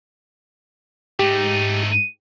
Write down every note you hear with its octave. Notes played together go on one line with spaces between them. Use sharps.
G#2 A3 D#4 G4